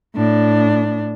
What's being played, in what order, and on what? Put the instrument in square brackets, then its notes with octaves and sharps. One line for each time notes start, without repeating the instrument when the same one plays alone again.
[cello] A2 D4